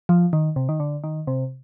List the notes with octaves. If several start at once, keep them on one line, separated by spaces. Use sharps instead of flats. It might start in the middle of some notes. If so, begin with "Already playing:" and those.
F3
D#3
C3
D#3
D3
D#3
C3